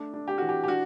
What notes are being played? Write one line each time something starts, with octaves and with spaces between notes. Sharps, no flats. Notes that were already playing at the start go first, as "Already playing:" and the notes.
Already playing: A3 D4
D4
G4
E3 F#4
G4
G4
D4 F#4